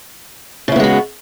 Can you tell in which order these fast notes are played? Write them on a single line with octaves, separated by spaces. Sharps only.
C#3 E4 B3 G#3 F#4